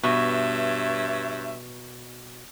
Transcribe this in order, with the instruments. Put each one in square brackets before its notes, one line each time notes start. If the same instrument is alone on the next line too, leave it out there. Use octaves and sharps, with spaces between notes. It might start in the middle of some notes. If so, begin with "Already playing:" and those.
[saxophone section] G2 C#5 E5 [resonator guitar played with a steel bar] B2